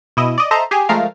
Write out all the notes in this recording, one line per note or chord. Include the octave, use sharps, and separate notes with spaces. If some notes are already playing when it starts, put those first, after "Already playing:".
B2 E4 D#5
D5 D#5
A4 C5 D#5 E5 A5 A#5
G4 G#4 G#5
F3 G#3 A3 A#4 F5